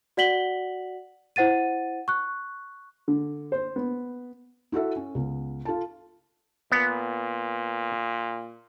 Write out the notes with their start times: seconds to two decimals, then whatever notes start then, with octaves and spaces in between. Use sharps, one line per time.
0.17 F#4 D5 F#5 B6 F#7 G7
1.36 E4 C5 F#5 A6 D#7
2.08 C#6 F#6
3.08 D3
3.52 C5
3.76 B3
4.72 E4 F#4 A4 E5
4.96 C#4
5.15 C#2 B3
5.65 F4 A4 A5
6.72 A#2 B3